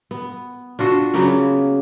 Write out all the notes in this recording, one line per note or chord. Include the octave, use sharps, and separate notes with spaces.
B3
D4 F4 F#4 A4
C#3 F#3 A#3 B3